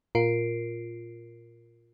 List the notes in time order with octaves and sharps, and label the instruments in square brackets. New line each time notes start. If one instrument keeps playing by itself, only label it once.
[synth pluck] A#2 F4 A#4 C7 D7